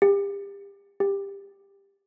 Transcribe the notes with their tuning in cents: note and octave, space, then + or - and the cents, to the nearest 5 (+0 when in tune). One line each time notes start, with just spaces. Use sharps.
G4 +35
G4 +20